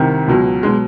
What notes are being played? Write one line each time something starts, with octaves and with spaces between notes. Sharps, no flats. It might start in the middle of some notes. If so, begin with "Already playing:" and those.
Already playing: C2 C3 D#3
C#2 B2 F#3
B2 F#3 G#3